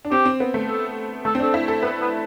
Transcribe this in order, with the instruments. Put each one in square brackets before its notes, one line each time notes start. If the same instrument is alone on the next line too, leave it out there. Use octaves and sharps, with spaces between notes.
[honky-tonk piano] D4
[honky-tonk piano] C4 [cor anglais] G4
[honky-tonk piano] C4
B3
A3
[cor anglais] A4
[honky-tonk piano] A3 [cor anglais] A4
[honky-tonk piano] C4
[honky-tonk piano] D4 [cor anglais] A4
[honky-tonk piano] E4
A4
[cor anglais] B3 [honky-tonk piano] B4
[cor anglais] B3